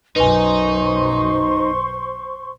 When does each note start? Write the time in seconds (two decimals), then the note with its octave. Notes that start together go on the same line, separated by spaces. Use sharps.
0.16 B1 F#2 D#4 B4 C5 G#5 C6 C#6